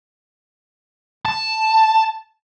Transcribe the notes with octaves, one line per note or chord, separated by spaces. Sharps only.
A5